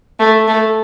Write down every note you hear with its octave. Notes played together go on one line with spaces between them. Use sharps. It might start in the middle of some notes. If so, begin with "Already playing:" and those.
A3
A3